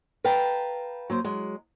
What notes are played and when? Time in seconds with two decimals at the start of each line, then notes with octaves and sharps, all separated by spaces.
0.24 B4 F5 G5 A5 A#5
1.10 F#3 A#3 C5
1.24 F#3 G#3